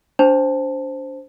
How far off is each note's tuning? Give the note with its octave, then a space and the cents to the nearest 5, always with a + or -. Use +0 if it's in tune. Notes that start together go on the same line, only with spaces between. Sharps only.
D4 -25 C5 +0 A5 +0